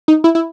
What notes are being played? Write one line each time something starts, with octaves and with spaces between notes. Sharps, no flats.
D#4
E4
E4